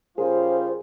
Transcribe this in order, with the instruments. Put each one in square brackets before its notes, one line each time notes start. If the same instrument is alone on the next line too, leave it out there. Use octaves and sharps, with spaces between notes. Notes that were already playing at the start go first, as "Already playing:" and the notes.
[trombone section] C#3 G3 F4 [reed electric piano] G#4 A#4 [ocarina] C5